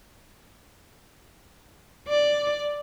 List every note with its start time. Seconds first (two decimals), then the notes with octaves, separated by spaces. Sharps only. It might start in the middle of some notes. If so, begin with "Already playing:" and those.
2.08 D5